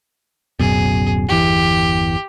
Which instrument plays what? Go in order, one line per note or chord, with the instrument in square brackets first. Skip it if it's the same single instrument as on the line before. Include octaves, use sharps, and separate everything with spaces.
[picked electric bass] D1 F#2 B2 [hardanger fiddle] G#4
[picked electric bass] G1 E2 E3 [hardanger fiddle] G4